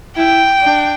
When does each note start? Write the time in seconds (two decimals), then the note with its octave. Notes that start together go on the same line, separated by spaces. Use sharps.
0.17 E4 G5
0.61 D4